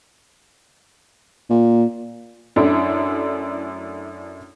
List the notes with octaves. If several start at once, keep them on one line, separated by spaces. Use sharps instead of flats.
A#2
F#2 A3 D4 E4